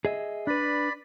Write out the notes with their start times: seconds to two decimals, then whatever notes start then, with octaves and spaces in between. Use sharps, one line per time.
0.05 G#4 D#5 E5
0.47 D4 B4 D5 B5